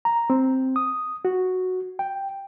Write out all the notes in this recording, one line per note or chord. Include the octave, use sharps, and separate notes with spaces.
A#5
C4
D#6
F#4
G5